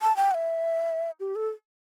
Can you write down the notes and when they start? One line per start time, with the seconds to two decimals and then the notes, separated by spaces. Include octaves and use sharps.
0.02 A5
0.17 G5
0.31 F#5
0.34 E5
1.20 G4
1.35 A4